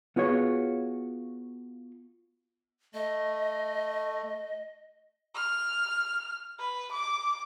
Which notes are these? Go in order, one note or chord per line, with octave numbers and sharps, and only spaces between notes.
B3 F4 F#4 G#4 C#5
A3 D#5
F6
B4
D6